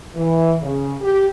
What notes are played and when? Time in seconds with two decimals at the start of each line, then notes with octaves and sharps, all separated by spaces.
0.15 E3
0.62 C#3
1.01 G4